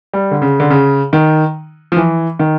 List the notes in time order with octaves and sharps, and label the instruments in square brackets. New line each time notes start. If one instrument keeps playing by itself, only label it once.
[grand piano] G3
D3
C#3
D3
C#3
D#3
F3
E3
D#3